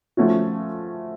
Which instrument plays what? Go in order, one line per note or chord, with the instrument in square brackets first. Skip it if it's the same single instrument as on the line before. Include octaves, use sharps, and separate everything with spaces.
[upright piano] F3 A3 C#4 F#4